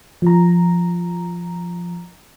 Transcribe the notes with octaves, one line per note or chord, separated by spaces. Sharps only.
F3 A#5